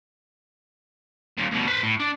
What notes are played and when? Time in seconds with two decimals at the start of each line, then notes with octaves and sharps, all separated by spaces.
1.38 D#2 A#2
1.51 D2 B2
1.67 B4 C5
1.83 A2
2.00 D4